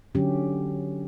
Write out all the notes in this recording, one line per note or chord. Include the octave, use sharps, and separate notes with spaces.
D3 F#3 C#4 G4